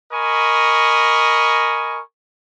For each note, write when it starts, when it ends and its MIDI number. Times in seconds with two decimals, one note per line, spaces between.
0.13 2.00 70
0.13 2.00 75
0.13 2.00 80
0.13 2.00 83
0.13 2.00 85